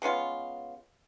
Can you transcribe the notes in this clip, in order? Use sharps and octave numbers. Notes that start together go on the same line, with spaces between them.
G#3 B3 C#4 F4